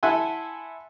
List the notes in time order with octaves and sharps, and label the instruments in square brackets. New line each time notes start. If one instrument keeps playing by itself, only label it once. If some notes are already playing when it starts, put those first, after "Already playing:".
[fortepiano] E4 A4 E5 F#5 G#5 C6